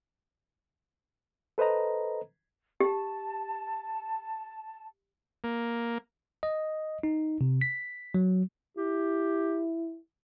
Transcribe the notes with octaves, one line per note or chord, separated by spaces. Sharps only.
A4 B4 C5 D#5 A#5
G4 A5
A#3
D#5
D#4
C3
B6
F#3
E4 G4